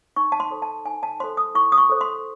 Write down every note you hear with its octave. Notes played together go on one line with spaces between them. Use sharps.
D#4 C#6
A5
C6
A4 C5
A5
D#4 G#5
A5
A4 C5 C6
D#6
E4 C#6
D#6
C#6
A4 C5
C6